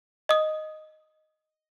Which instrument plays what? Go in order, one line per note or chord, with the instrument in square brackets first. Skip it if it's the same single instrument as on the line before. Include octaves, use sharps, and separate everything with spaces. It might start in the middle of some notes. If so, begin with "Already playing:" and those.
[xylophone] D#5 D#6